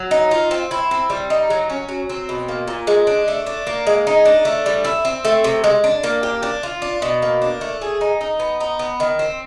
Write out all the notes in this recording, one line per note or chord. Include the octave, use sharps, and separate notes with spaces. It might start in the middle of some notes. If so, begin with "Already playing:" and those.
Already playing: F#3
D#4
F4
C4
E4
C4
G3
D#4
F#3
C#4
F#3
C4
B2
A#3
A#2
G#3
D4
A3
D4
A#3
G#3
D#4
D4
A3
G3
E4
C4
A3
C3
G#3
D4
A#3
G4
D4
F4
D4
B2
A#3
D4
A3
G#4
D#4
D#4
B3
D#4
B3
D#3
C4